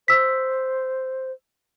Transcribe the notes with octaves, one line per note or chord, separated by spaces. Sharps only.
C5 E6 B6